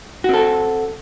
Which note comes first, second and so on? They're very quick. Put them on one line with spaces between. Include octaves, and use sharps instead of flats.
F#4 C4 A4